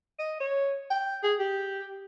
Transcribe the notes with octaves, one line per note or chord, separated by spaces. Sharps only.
D#5
C#5
G5
G#4
G4